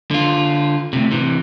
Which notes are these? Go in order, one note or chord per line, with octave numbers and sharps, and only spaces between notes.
D3 F4
A2 C3
C3 E3